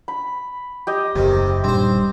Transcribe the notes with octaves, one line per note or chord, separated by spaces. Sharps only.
B5
G4 D#5
F#1 D#2 C3 D#3
D#1 G2 C4 C5